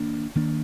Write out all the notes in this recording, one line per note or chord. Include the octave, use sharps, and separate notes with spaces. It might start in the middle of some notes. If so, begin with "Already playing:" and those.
Already playing: D#3 A#3 D4
D#3 A#3 D4